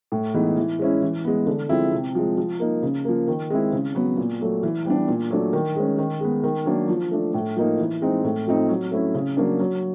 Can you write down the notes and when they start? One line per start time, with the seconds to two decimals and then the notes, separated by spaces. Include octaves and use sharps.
0.12 A2
0.34 E3 G#3 B3 D#4
0.57 E3
0.79 G#3 C#4 E4
1.02 E3
1.25 G#3 B3
1.47 D3
1.69 F3 G#3 C4 E4
1.92 C3
2.15 F3 G#3
2.38 F3
2.60 A#3 D#4
2.82 C#3
3.05 F3 A#3
3.27 D#3
3.50 G#3 C4 E4
3.72 C#3
3.95 F#3 B3
4.17 A#2
4.41 F#3 A3
4.63 E3
4.85 G3 B3 D4
5.08 A#2
5.31 F#3 A3 D4
5.53 D#3
5.76 G#3 C#4
5.98 D#3
6.21 G#3 B3
6.43 D#3
6.66 F#3 A#3 D4
6.89 F3
7.11 A3 D4
7.34 A2
7.56 F3 A#3 D#4
7.79 E3
8.02 G#3 C4 D#4
8.24 A2
8.47 F3 A3 C4 D#4
8.69 F#3
8.91 A3 C#4 E4
9.14 C#3
9.37 F#3 A#3 D4
9.60 F#3